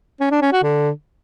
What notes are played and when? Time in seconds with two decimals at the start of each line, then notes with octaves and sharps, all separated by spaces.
0.20 C#4
0.31 D4
0.42 C#4
0.52 F#4
0.63 D3